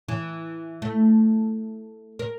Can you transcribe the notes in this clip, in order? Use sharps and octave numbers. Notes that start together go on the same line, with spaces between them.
E3
A3
A#4